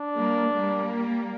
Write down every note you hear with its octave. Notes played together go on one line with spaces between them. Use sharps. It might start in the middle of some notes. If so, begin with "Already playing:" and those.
Already playing: D4
G3 A#3
G3 A#3